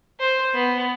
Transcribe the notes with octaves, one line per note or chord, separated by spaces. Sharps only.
C5
B3